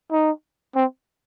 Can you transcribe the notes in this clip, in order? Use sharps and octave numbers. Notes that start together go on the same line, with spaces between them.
D#4
C4